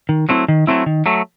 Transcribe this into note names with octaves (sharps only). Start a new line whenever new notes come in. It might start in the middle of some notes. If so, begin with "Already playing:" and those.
D#3
F#3 A3 C4 E4
D#3
F#3 A3 C4 E4
D#3
F#3 A3